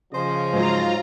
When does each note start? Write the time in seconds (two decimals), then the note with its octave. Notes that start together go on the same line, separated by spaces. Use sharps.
0.13 C#3 F3 G#4 C5 D#5
0.53 G#2 F#3 F4 A#5